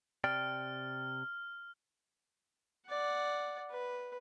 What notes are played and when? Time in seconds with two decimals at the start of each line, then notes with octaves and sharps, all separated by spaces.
0.24 C3 D5 G5 F6
2.88 D5 F#5
3.70 B4